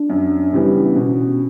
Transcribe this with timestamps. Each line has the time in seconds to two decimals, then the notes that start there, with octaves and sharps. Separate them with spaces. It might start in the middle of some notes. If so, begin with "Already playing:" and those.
Already playing: D4
0.10 F#2
0.53 C#3 E3 G3 B3
0.96 B2 C#4